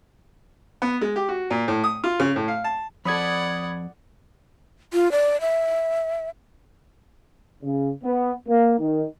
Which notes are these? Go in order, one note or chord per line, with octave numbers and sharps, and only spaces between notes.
B3
G#3
G4
F#4
A#2
A2
D#6
F4
C#3
A2
F5
A5
F2 A4 D5 F#5 B5 D#6 G#6
F4
D5
E5
C#3
B3
A#3
D#3